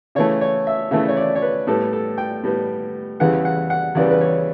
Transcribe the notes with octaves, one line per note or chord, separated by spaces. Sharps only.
C#3 E3 A3 C#5
C#5
E5
C#3 E3 A3 E5
C#5
D5
C#5
B4
A2 G3 B3 A4
A4
G5
A2 G3 B3
E2 C#3 E3 G3 B3 F#5
F#5
F#5
E2 C#3 E3 G3 B3 D5
B4
C#5